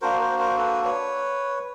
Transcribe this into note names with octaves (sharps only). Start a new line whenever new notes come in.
A#3 D4 F#4 A#4 C5
A#4 C5
A#4 C5
A4 B4
B4 C#5